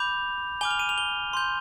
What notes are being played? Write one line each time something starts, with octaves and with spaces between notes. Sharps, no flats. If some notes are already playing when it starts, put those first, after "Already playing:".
Already playing: B5 D6 G6 F7
G#5 D6 F6 G7
F7
D#7
F7
G7
C6 G6